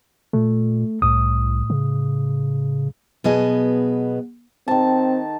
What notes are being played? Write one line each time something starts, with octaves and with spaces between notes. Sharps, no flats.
A#2 A3
C2 A2 D#6
C#3
B2 F#3 B3 G#4 D#5 A5
D#3 C4 A5